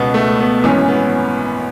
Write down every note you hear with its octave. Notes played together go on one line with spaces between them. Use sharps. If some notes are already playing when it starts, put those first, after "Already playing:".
Already playing: C#2 B2 B3
A3
B3
G#1 F#2 E3 C#4
B3